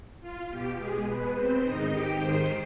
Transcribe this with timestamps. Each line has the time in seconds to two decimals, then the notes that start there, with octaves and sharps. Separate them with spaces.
0.20 F4
0.48 B2 G4
0.77 G#3 G#4
1.05 B2 B3 B4
1.33 C4 C5
1.62 G#2 D#3 D#4 D#5
1.90 G4 G5
2.19 G#2 D#3 C5 C6